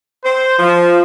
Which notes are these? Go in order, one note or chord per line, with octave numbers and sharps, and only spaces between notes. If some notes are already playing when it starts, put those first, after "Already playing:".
C5
F3